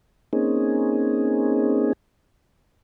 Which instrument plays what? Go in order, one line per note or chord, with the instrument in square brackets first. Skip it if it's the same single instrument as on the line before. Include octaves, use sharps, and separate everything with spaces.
[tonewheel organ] A#3 C4 C#4 D#4 G#4